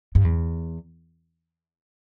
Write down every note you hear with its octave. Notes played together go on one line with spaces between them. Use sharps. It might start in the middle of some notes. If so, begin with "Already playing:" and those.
G2
E2